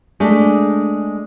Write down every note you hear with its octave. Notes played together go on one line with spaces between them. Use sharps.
G#3 A3 D4